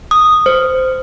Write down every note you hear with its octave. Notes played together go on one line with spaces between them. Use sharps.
D#6
C5